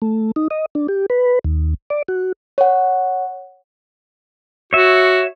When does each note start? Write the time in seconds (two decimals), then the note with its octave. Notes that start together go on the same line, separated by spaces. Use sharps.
0.02 A3
0.36 D#4
0.51 D#5
0.75 D4
0.88 G4
1.10 B4
1.44 D#2
1.90 D5
2.08 F#4
2.58 C#5 F#5
4.73 F#4 C#5 E5